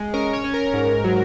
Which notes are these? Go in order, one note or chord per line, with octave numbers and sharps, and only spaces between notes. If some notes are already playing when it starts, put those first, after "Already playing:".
Already playing: G#3
C#4 A#4
C#5
C#4
A#4
G#2
F#3